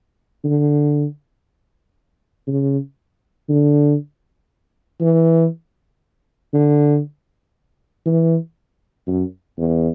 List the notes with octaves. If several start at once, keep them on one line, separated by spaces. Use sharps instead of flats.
D3
C#3
D3
E3
D3
E3
F#2
E2